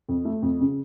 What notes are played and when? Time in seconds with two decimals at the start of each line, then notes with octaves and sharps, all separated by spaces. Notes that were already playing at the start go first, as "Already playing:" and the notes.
0.09 F2
0.25 A3
0.42 F2
0.60 C#3